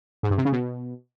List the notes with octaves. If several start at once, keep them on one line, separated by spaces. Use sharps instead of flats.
G#2
G2
C3
C#3
B2